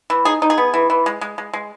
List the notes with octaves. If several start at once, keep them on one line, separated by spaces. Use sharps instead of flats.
E3
D#4 G#4
D#4
G#4
B3
E3
E3
G#3
G#3
G#3
G#3